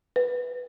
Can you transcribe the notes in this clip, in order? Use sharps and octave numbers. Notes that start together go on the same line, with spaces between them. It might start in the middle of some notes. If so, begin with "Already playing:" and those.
B4